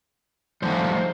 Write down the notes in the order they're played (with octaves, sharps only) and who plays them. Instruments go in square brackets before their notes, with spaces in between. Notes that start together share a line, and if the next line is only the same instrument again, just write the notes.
[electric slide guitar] G2 F3 A3 D#4 C5